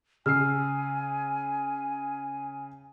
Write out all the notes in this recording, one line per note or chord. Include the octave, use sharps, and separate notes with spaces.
C#3 G#5 E6 F6 C7